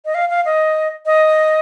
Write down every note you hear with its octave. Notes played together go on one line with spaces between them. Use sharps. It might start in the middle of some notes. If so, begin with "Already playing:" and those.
D#5
F5
F5
D#5
D#5